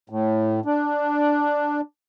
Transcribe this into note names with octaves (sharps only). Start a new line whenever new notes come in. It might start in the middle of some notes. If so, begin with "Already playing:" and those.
A2
D4